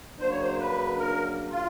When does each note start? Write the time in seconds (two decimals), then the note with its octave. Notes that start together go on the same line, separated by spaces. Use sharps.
0.20 F#2 C#3 F#3 A#3 D4 C5
0.31 C#5
0.40 C5
0.59 B4
0.99 A#4
1.51 F4